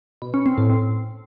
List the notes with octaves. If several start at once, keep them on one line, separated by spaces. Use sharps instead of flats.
B2
C#4
C4
A2
C4